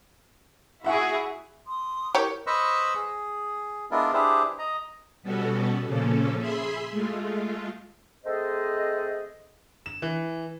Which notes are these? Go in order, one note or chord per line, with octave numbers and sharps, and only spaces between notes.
E4 F#4 G#4 E5 F#5 C#6
C6 D#6
E4 G4 A#4 C#5 G6
B4 C5 D#5 B5 C#6 E6
G#4
G#3 B3 D4 E4 F4 A#4
D4 E4 G4 G#4 B4 C5
D#5 A#5
B2 G3 B3 C#4 F#4 A4
A#2 C#3 F3 A#3 C#4 A4
G#4 E5 B5 C6
G#3 A3 F4
A3 C4 G#4 A4 C5 D#5
E7
E3